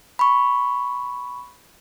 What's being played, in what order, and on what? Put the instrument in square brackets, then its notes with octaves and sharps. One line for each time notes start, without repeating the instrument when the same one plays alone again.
[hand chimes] B5 C#6